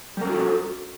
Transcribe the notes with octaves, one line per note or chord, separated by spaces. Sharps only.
G3 C#4 F#4 A4 A#4